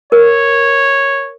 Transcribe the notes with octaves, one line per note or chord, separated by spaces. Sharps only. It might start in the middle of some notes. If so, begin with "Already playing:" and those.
A#4 C#5